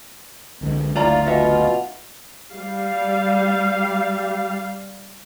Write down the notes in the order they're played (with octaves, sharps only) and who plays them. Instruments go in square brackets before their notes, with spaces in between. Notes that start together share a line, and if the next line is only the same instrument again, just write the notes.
[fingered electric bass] C2 D3 G#3
[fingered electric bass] F#1 D2 [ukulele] E4 D5 A#5 [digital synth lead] F4
[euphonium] B2 [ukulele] D#4 E5
[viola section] G3 F5